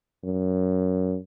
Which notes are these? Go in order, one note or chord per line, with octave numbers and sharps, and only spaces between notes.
F#2